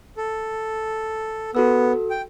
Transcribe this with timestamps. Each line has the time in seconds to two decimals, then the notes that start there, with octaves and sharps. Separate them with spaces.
0.17 A4
1.55 B3 F#4 A4 E6
2.10 G5